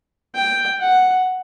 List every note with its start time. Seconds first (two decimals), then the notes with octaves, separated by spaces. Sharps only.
0.35 G5
0.80 F#5